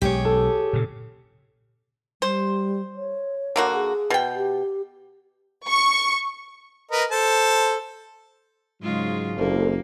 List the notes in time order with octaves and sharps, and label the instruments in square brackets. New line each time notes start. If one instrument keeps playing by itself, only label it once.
[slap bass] B1 G#3 [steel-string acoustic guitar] G4 G#4 C#5
[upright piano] A4
[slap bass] A#2 C#3
[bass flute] G3 [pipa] C5
[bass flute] C#5
[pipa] D3 A#3 F#4
[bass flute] G#4
[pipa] B2 G5
[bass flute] G4
[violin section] C#6
[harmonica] A#4 B4 D#5
A4 C5 A5
[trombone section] G#2 F#3 [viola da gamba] C#3 G#3 F4
[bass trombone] F#1 [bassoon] C2 [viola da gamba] A#3 [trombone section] A4